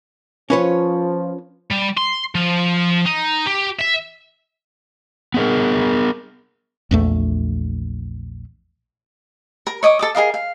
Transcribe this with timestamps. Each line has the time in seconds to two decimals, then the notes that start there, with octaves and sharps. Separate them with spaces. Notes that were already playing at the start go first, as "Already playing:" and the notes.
0.50 F3 C#4 B4 C#5
1.71 G3
1.98 C6
2.35 F3
3.06 D#4
3.47 G4
3.81 E5
5.34 B3 G#4 A#4
6.91 A#1 E2 A3
9.67 A#4
9.83 C#5 D#5 D6 D#6
9.99 A4 D6 D#6
10.15 G#4 A#4 D#5 F5
10.34 F5